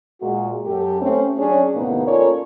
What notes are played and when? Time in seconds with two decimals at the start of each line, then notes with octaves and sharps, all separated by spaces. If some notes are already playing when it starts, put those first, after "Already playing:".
0.21 A#2 G#3 A#3 F#4
0.67 F#2 G4 A4
1.02 A3 C4 C#4
1.37 F#3 C#4 D4 G#4 C#5
1.75 D#2 A2 C3 A#3 B3 D#4
2.07 C#4 F4 A4 A#4 C#5 D5